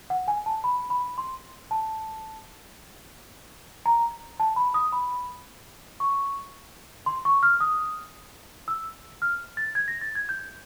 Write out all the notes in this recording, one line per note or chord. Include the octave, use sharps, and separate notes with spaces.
F#5
G#5
A5
B5
B5
C6
A5
A#5
A5
B5
D#6
B5
C#6
C6
C#6
F6
D#6
E6
F6
A6
G#6
A#6
A6
G#6
G6